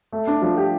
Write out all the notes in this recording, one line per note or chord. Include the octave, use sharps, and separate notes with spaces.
A3
D4
F3
G4